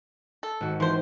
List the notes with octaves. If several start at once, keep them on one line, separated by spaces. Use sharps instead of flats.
A4
G#1 F#4
E3 F3 C4 C5